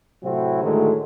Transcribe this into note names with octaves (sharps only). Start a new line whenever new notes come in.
A2 C3 F#3 C4 E4 F#4
A2 D3 D#3 F#3 G#3 A3